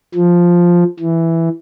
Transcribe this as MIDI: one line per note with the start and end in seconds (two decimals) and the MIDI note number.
0.15 0.84 53
1.00 1.49 52